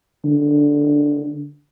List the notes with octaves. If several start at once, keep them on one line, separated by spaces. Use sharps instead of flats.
D3